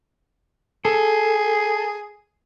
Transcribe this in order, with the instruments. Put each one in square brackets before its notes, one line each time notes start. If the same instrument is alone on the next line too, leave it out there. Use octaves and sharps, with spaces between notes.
[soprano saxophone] G#4 [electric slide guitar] A4